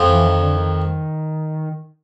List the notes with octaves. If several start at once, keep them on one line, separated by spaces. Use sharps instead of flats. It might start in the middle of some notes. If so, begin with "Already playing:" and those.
Already playing: F2 F3
E3
D#3
D3
D#3